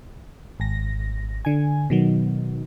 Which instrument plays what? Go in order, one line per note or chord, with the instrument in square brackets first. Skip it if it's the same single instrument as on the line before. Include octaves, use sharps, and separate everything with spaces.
[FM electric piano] G#1 A#6
D3 G#5
B2 D#3 F#3